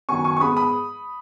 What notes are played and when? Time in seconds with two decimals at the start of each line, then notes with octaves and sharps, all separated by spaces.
0.09 F#2 D#3 F#3 B3 G#5 C#6
0.24 G#5 C#6
0.37 C#6
0.40 G#2 G#3 B3 B5 D#6
0.57 B5 D#6